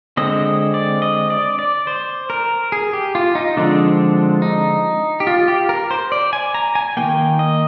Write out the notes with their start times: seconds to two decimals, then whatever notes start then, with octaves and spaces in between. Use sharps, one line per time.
0.17 D3 G#3 C4 D#5
0.74 D5
1.02 D#5
1.30 D5
1.59 D5
1.87 C5
2.30 A#4
2.72 G#4
2.93 G4
3.15 F4
3.35 D#4
3.57 D3 F3 G#3 C4 D4
4.42 D#4
5.20 G4
5.27 F4
5.48 G4
5.69 A#4
5.91 C5
6.12 D5
6.33 G#5
6.54 A#5
6.75 G#5
6.97 D#3 G3 A#3 G5
7.39 D#5